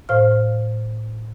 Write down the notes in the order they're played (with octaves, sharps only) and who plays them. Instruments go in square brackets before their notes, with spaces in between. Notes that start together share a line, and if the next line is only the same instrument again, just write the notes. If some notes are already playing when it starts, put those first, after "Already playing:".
[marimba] A2 C5 F5 F6